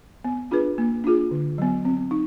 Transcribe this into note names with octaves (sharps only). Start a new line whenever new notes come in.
B3
D4 F4 G#4 B4
A#3
D4 F4 G#4
D3
F#3 B3
C4
D#4